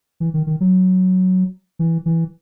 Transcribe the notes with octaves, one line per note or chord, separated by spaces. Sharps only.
E3
D#3
D#3
F#3
E3
E3